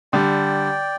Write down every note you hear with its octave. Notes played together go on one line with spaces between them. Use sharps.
D3 G3 D5 G5